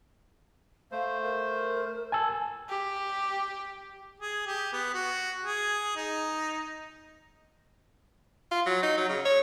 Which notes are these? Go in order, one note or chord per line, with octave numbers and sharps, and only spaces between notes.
A3 C5 F5
A#4
G#5 A5 E6
G4
G#4
G4
B3
F#4
G#4
D#4
F4
F#3
D#4
F#3
C#3
C#5